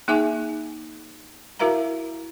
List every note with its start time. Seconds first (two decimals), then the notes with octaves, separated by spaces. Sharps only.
0.08 A#3 D#4 G#4 E5 G#5 D6
1.59 E4 F#4 A#4 E5 F5 A#5